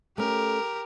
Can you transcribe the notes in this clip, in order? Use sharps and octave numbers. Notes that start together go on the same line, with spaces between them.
A3 C#4 G4 A#4